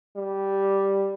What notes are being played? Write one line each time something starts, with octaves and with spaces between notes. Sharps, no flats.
G3